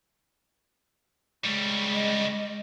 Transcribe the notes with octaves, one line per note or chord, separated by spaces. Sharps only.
C#3 G3 G#3
D#5